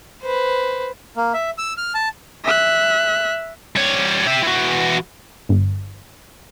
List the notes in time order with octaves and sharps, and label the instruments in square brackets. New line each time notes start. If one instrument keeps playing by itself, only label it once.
[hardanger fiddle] B4 C5
[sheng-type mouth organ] A#3
E5
E6
F6
A5
[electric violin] E5 F#6
[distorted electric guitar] G3 C#5
G4 E5
E3 F#4
[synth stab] G1